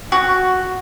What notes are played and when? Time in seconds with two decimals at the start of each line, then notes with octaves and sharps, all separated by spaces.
0.12 F#4